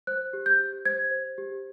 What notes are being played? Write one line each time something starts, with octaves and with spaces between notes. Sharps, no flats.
C5 F#6
G4
G6
G4
C5 G#6
C5
G4